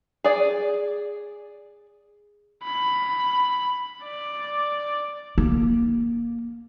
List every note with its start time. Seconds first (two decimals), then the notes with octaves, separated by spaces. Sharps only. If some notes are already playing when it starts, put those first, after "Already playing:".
0.24 G#4 D5
2.63 B5
4.03 D5
5.38 A#3